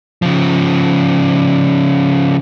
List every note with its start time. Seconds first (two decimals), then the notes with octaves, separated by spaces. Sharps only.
0.22 C#3 F3